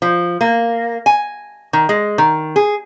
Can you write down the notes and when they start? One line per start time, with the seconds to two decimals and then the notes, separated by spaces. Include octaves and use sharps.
0.02 F3
0.41 A#3
1.06 G#5
1.73 D#3
1.89 G#3
2.18 D#3
2.56 G#4